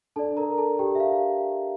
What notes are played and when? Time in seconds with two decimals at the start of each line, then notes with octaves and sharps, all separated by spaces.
0.16 D4 A4 D5 A5
0.37 A#4 A#5
0.58 A4 A5
0.79 G4 G5
0.95 E5
1.00 F5